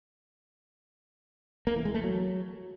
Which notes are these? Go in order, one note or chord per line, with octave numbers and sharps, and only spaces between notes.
A#3
E3
G#3
A3
F#3